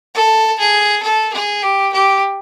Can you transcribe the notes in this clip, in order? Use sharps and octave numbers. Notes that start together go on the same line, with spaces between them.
A4
G#4
A4
G#4
G4
G4